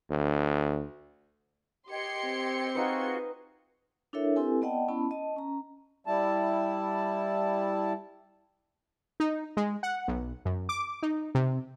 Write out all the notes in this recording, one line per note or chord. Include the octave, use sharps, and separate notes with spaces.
D2
G4 D#5 G5 C6 G#6 C#7
C4
D#4 F4 F#4 G#4 B4
D4 E4 A4 A#4 C#5 E5
C4 E4 G4 A4 B4 G#5
B3 D5 D#5 F#5 G5 A5
B3 C#4 E4 A5 B5
D#5 A5
C#4 A#5
G3 E4 A5
D#4
G#3
F#5
B1
F#2
D6
D#4
C3